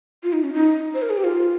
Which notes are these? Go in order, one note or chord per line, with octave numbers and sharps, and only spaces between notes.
F4
D#4
C#4
D#4
C5
A#4
G#4
G4
F4